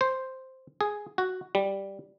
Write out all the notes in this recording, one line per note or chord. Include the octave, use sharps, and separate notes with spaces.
C5
G#4
F#4
G3